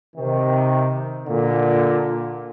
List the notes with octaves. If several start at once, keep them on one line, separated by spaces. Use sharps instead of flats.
C3 D#3
A#2 D3